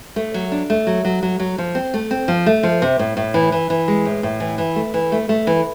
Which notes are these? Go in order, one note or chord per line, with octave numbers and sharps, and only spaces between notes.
A3
F#3
D4
A3
F#3
F#3
F#3
F#3
F3
C4
A3
C4
F3
A3
F3
C3
A2
A2
E3
E3
E3
G#3
A2
A2
E3
E3
A3
E3
A3
A3
E3